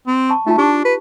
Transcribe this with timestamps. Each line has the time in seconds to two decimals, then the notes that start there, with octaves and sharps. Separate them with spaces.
0.07 C4
0.29 A5 C#6
0.47 A3 D#4 F4 A5
0.58 D4 G4 C#6
0.85 B4